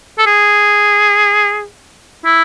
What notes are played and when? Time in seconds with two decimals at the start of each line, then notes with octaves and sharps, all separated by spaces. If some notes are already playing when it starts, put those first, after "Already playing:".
0.18 A4
0.26 G#4
2.25 E4